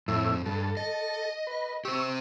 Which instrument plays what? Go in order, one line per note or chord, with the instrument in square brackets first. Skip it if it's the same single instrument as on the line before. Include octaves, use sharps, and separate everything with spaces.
[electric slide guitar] F2 [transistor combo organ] A2 E4
[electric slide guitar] G2 [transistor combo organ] A4
[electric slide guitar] D#5
[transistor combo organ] B4
[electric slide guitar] G4 C5 [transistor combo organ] C#6 E6